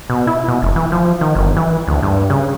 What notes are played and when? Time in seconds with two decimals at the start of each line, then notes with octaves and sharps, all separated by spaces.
0.10 B2
0.27 E4
0.48 B2
0.62 F1
0.76 E3
0.92 F3
1.21 D#3
1.35 G1
1.57 E3
1.88 D2
2.03 G2
2.30 C#3